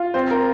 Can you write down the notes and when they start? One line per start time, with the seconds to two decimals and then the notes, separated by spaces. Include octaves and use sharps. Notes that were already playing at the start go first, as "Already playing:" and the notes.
Already playing: F4
0.14 C4 C5
0.31 A#4